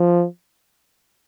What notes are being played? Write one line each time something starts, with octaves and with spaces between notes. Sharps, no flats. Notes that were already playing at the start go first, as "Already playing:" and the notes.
Already playing: F3